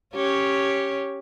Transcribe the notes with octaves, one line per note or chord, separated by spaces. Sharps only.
C#4 G4 C#5